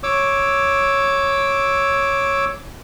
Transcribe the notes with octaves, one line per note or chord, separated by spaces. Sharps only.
C#5 D6 E6